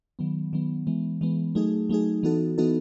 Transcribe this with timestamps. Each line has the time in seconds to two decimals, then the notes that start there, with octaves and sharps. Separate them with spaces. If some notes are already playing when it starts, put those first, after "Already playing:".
0.19 D#3 F#3 B3
0.53 D#3 F#3 B3
0.87 E3 G#3 B3
1.21 E3 G#3 B3
1.55 F#3 A3 D#4 G#4
1.89 F#3 A3 D#4 G#4
2.23 E3 B3 D#4 F#4 A4
2.58 E3 B3 D#4 F#4 A4